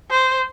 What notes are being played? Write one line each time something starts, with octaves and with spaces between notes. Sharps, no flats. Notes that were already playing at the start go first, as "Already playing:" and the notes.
C5